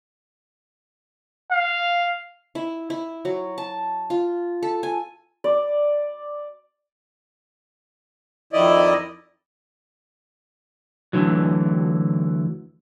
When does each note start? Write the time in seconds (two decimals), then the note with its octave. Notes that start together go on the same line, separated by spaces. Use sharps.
1.52 F5
2.55 E4
2.90 E4
3.25 F#3
3.58 A5
4.10 F4
4.62 A4
4.83 G#5
5.44 D5
8.53 F2 D#3 E4 D5 D#5
11.13 D2 G#2 D3 E3 F#3